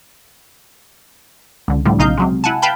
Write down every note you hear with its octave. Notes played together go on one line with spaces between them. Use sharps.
C#2 D3
A2 D3 F3 G3
B1 C#3 D#4 D#5 F5 G6
C3 F#3 G#3
E4 F#5 G#5 A5
B4 F5 G5 A5 B5 G6